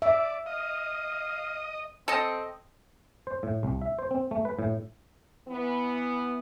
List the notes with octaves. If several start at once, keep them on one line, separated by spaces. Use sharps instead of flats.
D5 E5
D#5 F5
C4 A4 D#5
C5
A2
C2
E5
C5
C4
A3
B4
A2
E3 B3